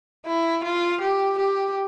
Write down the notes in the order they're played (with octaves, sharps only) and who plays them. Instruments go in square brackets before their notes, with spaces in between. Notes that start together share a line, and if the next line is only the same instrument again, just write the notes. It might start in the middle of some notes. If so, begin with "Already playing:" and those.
[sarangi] E4
F4
G4
G4